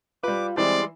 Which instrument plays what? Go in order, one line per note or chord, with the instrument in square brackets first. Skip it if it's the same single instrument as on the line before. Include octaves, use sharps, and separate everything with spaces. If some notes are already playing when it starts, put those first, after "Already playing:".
[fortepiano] G3 B4 [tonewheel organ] F4 [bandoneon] D6
[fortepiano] E3 [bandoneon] G3 G#3 C6 [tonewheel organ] C4 [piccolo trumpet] D5